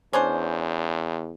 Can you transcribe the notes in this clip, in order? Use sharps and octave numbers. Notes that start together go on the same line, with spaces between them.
E2 C#4 D4 C5